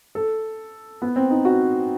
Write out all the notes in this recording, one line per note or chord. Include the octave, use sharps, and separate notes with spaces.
A4
B3
C4
D#4
F#4